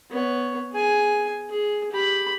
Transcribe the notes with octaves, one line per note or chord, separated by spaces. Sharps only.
B3 C#5
G#4 G#5
G#4
G4 B5